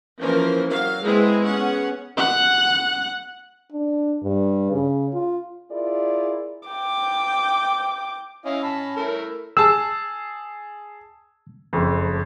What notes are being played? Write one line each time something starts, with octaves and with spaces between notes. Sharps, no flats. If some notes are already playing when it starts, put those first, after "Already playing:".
E3 F3 A#3 C#4 A#4 C5
F#3 F5
G#3 B3 C4 E4 G#4
B3 C#4 G#4 F#5
F#5
D4
G2
C#3
F4
E4 F4 G#4 A#4 D5
G5 D6
C#4 E4 D#5 F5
A5 B5
A3 E4 A#4
G#4 A5 E6
F#1 F2